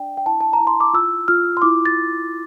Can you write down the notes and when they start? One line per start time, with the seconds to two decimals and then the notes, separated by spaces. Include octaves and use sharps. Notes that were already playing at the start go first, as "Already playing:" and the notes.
Already playing: D4 D5 G5
0.17 G5
0.26 E4 A5
0.41 A5
0.53 A#5
0.60 E4
0.67 C6
0.80 D6
0.94 F4 E6
1.28 F4 F6
1.57 C6
1.62 E4 D6
1.86 A6